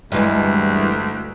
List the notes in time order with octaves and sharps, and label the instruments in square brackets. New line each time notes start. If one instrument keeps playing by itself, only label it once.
[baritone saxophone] D2 [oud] G2 E3 G#3